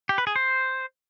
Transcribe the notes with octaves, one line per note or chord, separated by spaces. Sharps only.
G4
B4
G#4
C5